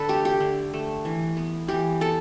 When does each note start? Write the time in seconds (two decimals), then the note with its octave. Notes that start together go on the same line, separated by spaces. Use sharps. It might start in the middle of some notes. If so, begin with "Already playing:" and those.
Already playing: D3 A4 B4
0.09 A3 G4
0.25 G4
0.40 D3
0.73 A3
1.05 E3
1.37 B3
1.68 E3 G4
2.01 B3 A4